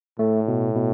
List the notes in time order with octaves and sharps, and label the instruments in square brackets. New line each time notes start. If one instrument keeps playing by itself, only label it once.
[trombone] A2 [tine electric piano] A3
[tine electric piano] B2
B2